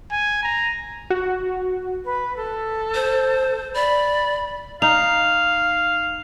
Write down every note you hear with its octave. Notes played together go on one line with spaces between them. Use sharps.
G#5
A#5
F#4
B4
A4
C5
D5 B5
D#4 F5 F7